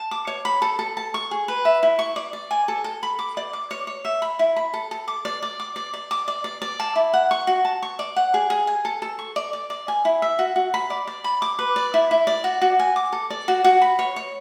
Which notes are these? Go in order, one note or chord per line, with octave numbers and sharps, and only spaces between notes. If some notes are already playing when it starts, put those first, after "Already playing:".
Already playing: A5
D6
C#5
B5
A4
A4
A5
C#6
G#4
B4
E5
E4
C#6
D5
D5
G#5
A4
A4
B5
D6
D5
D6
C#5
C#5
E5
B5
E4
B5
A4
A4
D6
D5
D5
D6
D5
D5
D6
D5
D5
D5
A5
E4
F#5
C#6
F#4
A5
C#6
D5
F#5
G#4
G#4
G#5
A4
A4
C#6
D5
D5
D5
G#5
E4
E5
F#4
F#4
B5
D5
D5
B5
D6
B4
D5
E4
E4
D5
F#4
F#4
G#5
D6
A4
D5
F#4
F#4
B5
C#5
C#5